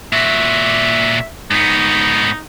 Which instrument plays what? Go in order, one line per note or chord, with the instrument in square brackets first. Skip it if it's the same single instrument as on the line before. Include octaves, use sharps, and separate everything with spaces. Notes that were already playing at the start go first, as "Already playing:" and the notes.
[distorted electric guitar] A#2 F#4 [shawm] E5
[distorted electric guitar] G#2 B3 [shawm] D#4